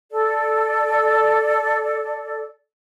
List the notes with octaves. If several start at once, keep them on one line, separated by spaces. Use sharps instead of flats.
A4 D5